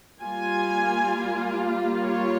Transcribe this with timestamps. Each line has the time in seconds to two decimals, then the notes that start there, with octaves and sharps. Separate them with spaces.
0.22 G3 A#3 F4 G#5
2.04 C#5